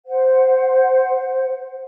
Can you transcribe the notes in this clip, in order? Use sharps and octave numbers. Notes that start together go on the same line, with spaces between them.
C5 F#5